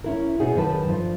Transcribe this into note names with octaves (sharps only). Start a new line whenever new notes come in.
C#4 E4 A#4
B2 B3 C#4 D#4 F#4 G#4
F#2 D#3 A4 B4 A5
G2 F3